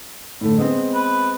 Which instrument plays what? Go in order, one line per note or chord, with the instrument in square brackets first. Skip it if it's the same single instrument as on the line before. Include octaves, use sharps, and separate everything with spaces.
[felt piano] A2 D3 A3
G#3 B3 C4
[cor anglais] B4